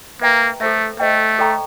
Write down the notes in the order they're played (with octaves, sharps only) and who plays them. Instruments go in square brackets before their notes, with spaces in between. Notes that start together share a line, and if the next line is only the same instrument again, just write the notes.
[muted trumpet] A#3 [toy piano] B4 E5 G5 A#5
[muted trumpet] A3 [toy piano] A4 C5 E5
[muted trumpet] A3 [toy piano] C5 D#5 G5
[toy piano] A4 D5 G5 A#5 C#6